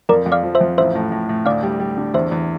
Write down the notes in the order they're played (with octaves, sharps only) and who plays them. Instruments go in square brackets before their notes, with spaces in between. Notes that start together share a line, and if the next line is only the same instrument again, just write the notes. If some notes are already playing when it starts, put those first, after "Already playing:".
[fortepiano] F2 [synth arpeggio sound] A#4 D5
[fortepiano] F2
[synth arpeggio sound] D5 F5
[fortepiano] F3
[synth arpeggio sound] C5 E5
[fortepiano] F2
[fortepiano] A1 [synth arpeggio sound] C5 E5
[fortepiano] A2
A2
A2
[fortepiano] D2 [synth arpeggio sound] D5 F5
[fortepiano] G3
G3
D3
[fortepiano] E2 [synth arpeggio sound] C5 E5
[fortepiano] E2